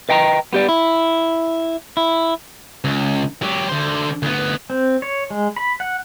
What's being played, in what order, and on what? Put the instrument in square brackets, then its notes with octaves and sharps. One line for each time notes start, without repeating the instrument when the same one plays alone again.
[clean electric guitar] B4 D#5 G5 G#5 A#5
B3 G4 D5
E4
E4
[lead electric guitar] C#2
F#3 G4
D3 C5
D2 B3
[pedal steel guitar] C4
C#5
G#3
B5
F#5